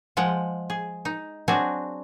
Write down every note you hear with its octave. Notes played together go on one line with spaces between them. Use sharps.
F3 G#3 F#5 G5
G#4
D#4
F#3 C4 D4 F#4 G#4 G#5